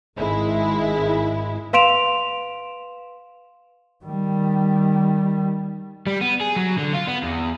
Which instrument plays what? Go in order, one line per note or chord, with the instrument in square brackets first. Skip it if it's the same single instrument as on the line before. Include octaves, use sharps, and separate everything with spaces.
[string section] G#1 G#3 E4
[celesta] B4 F5 C6 D7 E7 F7
[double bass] D#3 G3
[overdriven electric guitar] G3
B3
G#4
F#3
D3
F4
B3
E2